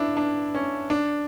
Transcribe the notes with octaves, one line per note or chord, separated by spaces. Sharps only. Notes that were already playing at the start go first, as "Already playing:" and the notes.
Already playing: D4 E4
D4
C#4
D4